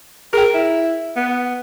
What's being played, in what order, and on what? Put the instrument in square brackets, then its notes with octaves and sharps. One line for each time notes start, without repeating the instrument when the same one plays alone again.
[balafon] G#4 G5 [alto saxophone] A#4
[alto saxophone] E4
B3